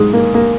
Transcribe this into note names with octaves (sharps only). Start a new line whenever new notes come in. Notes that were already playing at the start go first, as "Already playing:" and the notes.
Already playing: G#2 G#3
A#3
A#3